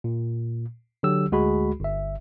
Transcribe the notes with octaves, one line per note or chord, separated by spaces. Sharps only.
A#2
D3 F#3 G4 E6
D2 G#3 F#4 G#4 B5
G1 E5